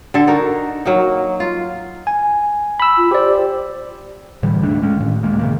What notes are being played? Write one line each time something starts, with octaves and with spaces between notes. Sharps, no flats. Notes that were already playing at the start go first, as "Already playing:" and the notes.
D3 A4
D#4 F#4 A#4
F#3 A#3 D#4
F4
G#5
B5 E6
F4
G4 C5 D5
A2 D3 E3 G3
D#1 G#2 A3 D4
G#3 C#4
A2 D#3
D1 G2 G#3 A#3
C3 D#3 A#3